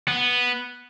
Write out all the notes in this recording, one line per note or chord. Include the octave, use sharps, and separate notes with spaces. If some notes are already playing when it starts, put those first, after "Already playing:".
B3